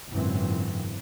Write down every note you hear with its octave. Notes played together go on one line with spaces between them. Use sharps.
G#1 F#2 A#2 D3 E3 C4